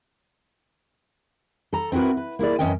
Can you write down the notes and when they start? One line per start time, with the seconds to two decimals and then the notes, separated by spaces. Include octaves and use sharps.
1.73 A4 A#5
1.92 C4 E4 F#4 A#4 B4
2.17 B4
2.39 A#3 E4 G#4 D5
2.59 F#2 B2 E3 C#4 D#5 G5